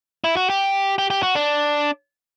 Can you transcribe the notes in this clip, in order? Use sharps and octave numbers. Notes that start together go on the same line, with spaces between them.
E4
F#4
G4
G4
G4
F#4
D4